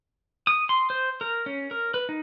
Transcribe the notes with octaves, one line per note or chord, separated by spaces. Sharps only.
D#6
C6
C5
A#4
C#4
A#4
B4
D#4